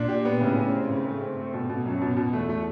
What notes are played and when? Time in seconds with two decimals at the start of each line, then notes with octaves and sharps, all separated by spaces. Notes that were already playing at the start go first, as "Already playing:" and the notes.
Already playing: A#2 D4
0.08 G4
0.25 B3
0.40 A2 C#3
0.57 C#3
0.72 C4
0.88 G#2 C#3
1.05 A3
1.21 C4
1.37 G2 A3
1.53 B2
1.69 B2
1.85 F#2 F#3
2.01 B2
2.16 B2
2.33 E2 A3
2.49 A3